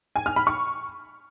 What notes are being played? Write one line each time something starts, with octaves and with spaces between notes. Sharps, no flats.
G#5
F6
B5
C#6